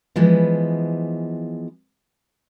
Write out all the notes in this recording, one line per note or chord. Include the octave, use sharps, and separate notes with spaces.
E3 F3 G#3 B3